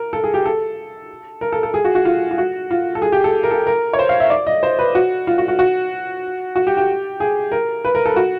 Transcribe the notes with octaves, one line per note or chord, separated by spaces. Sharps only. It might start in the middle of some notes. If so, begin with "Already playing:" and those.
Already playing: A#4
A4
G#4
G4
A4
A#4
A4
A4
G#4
F#4
F#4
F4
F4
F#4
F4
A4
G#4
G4
A4
A#4
A4
A#4
C#5
C5
F5
E5
D5
D#5
C5
B4
F#4
F4
F#4
F#4
F#4
F#4
G4
G4
G#4
A#4
B4
A#4
A4
F#4